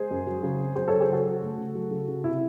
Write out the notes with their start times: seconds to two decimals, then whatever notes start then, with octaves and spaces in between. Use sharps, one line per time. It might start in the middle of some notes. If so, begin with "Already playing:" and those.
Already playing: G#3 G#4 C5
0.11 F#2
0.27 F#3
0.43 C#3
0.59 C4
0.75 F#3 G#4 C5
0.88 C#3 A4 C#5
1.00 G#4 C5
1.08 F#3 F#4 A4
1.26 C#3
1.42 A3
1.58 C#3
1.75 F#3
1.91 C#3
2.08 C#3
2.24 C3 E4